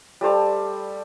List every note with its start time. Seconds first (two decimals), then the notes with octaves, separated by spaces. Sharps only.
0.21 G3 A3 C5 A5